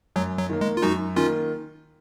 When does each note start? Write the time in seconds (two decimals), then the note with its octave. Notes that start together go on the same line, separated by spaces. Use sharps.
0.16 F#2 F#3
0.39 F#3
0.50 D#3 A#3
0.61 G#3
0.77 F4
0.82 F#2 D#4 F#4
1.16 D#3 A#3 C#4 F4